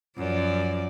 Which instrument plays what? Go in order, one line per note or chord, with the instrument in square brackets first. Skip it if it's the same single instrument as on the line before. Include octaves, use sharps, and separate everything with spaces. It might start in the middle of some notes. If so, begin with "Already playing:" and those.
[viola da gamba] F#2 F3 D5